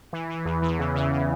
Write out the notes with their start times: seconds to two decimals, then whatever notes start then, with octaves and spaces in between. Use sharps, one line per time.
0.13 E3
0.29 E3
0.45 E2
0.62 E3
0.79 C#3
0.96 C#3
1.12 C#3